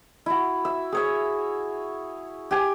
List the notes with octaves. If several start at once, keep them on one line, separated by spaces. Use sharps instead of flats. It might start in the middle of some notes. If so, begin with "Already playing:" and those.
E4 F#4
E5
G#4 C#5 E5
G4 G#5